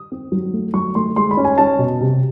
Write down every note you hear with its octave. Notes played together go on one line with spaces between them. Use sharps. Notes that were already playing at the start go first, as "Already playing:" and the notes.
Already playing: D#6
C4
F#3
A3
F#3 C#6
A3 C6
G#3 C6
B5
C#4
G#5
C#4 A5
B2
C3